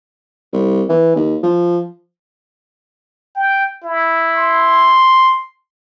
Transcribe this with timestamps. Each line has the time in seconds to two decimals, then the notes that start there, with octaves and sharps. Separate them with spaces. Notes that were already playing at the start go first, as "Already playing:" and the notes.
0.53 C2
0.89 E3
1.16 D#2
1.43 F3
3.35 G5
3.84 E4
4.36 C6